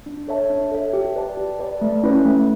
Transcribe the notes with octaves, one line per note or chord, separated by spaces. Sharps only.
D4
A4 C#5 E5 A5
D4
A4 C#5 E5 A5
G4
B4 D5 A5
G4
B4 D5 A5
A3
C#4 E4 B4
A3